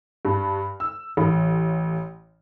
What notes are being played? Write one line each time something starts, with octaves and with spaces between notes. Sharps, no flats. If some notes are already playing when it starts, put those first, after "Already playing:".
G2
E6
A1